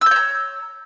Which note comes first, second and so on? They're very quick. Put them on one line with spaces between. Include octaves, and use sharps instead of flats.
E6 G6 C#5 A#5